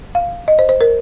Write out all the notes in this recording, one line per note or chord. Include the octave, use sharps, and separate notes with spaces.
F5
D#5
C5
C5
A#4